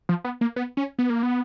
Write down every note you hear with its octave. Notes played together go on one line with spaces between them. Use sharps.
F3
B3
A#3
B3
C#4
B3
A#3
B3